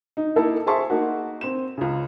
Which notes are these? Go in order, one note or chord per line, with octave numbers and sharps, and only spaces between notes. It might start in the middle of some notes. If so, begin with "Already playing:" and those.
D#4
A#3 D#4 E4 A4
G#4 C5 E5 A5 C6 C#6
A#3 D#4 F#4
C4 E7
C#2 C#3